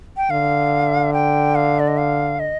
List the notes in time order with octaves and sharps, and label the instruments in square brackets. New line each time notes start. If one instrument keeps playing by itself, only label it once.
[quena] G5
[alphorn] D3 [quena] F5
[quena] G5
F5
D5
D#5
F5
D#5